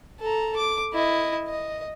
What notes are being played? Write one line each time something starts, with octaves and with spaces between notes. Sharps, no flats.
A4 A#5
D6
E4 D#5
D#5